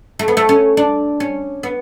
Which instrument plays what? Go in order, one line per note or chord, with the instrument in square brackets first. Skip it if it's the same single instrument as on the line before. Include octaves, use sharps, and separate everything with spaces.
[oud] A3
B3
A3
C#4
D4
C#4
B3